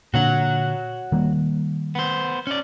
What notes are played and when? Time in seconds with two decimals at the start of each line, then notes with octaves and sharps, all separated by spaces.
0.14 A#2 D3 F#4 C#5 F#5
1.12 D#3 G3 A#3
1.95 B3 C5
2.47 C#4 D5